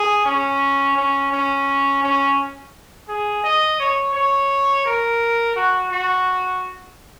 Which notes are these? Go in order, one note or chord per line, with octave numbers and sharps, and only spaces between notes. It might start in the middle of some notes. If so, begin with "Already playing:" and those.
Already playing: G#4
C#4
C#4
C#4
C#4
G#4
D#5
C#5
C#5
A#4
F#4
F#4